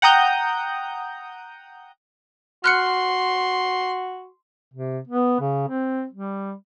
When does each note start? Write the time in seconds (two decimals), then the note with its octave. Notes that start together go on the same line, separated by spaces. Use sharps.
0.02 F#5 G5 A#5 D#6 G6
2.64 F#4 C6 F6 F#6 C#7
4.74 C3
5.07 B3
5.40 C#3
5.68 C4
6.12 G3